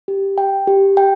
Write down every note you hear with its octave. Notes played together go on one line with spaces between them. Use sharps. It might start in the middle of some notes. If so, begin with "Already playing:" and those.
G4
G5
G4
G5